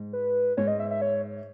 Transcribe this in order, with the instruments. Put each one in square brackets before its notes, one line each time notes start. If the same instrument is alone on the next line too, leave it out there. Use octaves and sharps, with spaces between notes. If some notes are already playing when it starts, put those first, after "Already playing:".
Already playing: [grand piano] G#2
[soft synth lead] B4
[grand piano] G#2 [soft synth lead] C#5
[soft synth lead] D#5
E5
E5
C#5